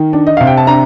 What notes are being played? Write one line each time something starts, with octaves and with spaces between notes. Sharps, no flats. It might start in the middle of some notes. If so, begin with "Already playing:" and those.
Already playing: D#3
D4
D#5
C3 F5
G5
A5
D4 A#5